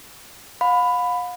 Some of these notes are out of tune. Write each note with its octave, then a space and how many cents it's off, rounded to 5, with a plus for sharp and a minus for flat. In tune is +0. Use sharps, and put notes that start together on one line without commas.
F5 +40 B5 +15